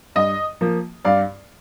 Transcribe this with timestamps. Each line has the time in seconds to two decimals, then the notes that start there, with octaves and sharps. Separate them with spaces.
0.16 G2 D#5
0.61 F3 A#3
1.05 G2 D5 F5